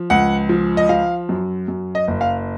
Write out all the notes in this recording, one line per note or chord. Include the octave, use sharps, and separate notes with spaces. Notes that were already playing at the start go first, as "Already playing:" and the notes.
Already playing: F3
C#2 F#5
F3
D#5
F3 F5
F#2
F#2
D#5
F#1
F5